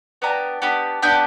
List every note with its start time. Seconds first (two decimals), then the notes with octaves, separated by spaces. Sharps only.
0.22 B3 D4 G4 A#5
0.62 B3 D4 G4
1.02 B3 D4 G4 G5